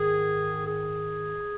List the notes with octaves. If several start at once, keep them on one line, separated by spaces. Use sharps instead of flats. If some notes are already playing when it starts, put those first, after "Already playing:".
Already playing: G#2 D#3 G#4
G#4